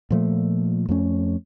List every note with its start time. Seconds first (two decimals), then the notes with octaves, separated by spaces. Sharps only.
0.11 A#2 F3 A3
0.89 F2 A3 C#4